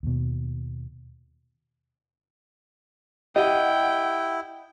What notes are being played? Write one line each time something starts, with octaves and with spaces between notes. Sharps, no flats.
D#2 B2
E4 G4 D#5 F#5 G5